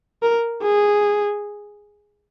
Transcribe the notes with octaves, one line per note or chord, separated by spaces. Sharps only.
A#4
G#4